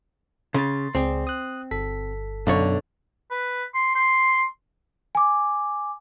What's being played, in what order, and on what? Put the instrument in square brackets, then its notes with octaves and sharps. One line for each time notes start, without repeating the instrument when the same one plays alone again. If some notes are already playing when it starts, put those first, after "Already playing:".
[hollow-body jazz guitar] C#3 [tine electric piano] C6 A6
[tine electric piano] C#2 G#4 D5 [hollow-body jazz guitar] C4
[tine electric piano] D#6 F#6
G1 A4 B6
[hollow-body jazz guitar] B1 D3 C#5 [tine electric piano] F#2
[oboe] B4
C6
C6
[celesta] G#5 D6